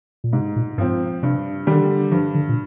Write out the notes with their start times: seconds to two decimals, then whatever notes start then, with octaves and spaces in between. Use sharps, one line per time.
0.24 A#2
0.33 G#2 C3
0.56 A#2
0.78 G2 F3 C4
1.23 G2 C3
1.67 D3 D#3 G3
2.11 G2 F3
2.34 D3
2.49 A#2